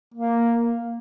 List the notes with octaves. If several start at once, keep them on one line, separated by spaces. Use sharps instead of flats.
A#3